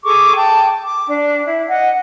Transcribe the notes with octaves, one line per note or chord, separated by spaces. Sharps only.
G#4 A4 C#6 D6
G5 A5
D6
D4
E4
D#5 F#5